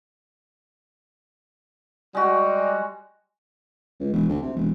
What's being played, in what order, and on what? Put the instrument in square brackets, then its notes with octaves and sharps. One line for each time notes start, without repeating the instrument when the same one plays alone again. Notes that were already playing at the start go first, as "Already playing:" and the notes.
[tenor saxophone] G3 [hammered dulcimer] G#3 F#4
[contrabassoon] C#2
E1
D2
C3
E1